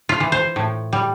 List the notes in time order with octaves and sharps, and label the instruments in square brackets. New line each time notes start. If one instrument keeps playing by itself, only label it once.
[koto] F4
E3
C5
A2
G3